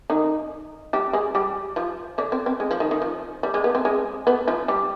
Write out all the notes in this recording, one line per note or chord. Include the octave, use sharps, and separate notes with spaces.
D#3 D#4
G3 G4
G#3 G#4
G3 G4
F3 F4
D3 D4
C4
C4
G#3
F3
D#3
D#3
F3
G3
G#3
B3
C4
G#3
B3
F3 F4
G3 G4